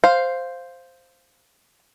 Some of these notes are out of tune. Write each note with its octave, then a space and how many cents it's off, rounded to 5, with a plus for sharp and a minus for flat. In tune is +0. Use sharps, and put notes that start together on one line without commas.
C5 +0 F5 +0